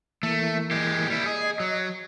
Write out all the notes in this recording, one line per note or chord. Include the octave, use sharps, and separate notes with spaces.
E3 A3 A#3
G#3 G4
G3 E4
G#4 D#5
F#3